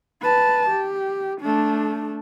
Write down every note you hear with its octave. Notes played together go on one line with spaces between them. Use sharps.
B4 A5
G4
A3 D4